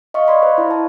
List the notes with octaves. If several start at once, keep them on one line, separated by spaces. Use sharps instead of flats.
D#5 F5 C#6
D5 F5 B5 C6
C5
E4
A5